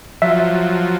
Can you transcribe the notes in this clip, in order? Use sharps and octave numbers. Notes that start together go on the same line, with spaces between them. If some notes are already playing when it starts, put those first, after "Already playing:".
F3 F#3 E5